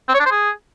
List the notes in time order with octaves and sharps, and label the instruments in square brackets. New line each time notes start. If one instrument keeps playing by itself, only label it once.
[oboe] C4
C#5
D4
C5
G#4